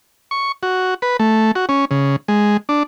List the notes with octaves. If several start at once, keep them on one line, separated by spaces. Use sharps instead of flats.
C#6
F#4
B4
A3
F#4
C#4
C#3
G#3
D4